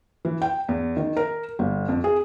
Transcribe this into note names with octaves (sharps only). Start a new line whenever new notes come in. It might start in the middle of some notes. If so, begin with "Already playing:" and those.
E3
G5
E2
D#3
A#4
G1
F2
G#4